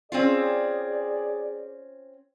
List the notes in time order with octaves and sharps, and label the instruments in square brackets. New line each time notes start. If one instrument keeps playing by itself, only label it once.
[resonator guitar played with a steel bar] C4 C#4 F4 [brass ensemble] G#4 D5